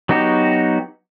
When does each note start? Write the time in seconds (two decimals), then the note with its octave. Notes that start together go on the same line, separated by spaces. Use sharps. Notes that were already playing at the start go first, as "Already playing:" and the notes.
0.09 F#3 B3 D#4 F#4 G4